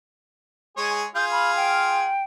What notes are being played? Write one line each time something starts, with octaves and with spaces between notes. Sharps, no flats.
G#3 G#4 C#5
F4 G#4 F5 G6
B5
G5